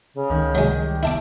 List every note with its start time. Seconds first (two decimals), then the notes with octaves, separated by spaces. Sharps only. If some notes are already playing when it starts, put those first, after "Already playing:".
0.14 C#3
0.30 C#2 D#3
0.55 F#3 G#3
0.81 G3
1.03 E4 A5 D6